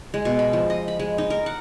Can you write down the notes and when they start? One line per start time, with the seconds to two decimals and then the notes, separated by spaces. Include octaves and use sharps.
0.14 G#3
0.25 B2
0.39 B5
0.53 F3
0.70 D#5
0.88 B5
0.99 G#3
1.18 D#4
1.30 A#4
1.46 F#5